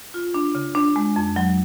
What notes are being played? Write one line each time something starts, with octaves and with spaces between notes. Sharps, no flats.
F4
D4
C#3
D4
G#3
F2
F#3